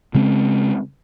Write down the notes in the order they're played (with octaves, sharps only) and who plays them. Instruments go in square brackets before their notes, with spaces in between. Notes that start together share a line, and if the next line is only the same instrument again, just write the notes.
[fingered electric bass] C#3 G#3 C4 C#4